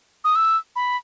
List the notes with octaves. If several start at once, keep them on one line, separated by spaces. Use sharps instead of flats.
D#6
E6
B5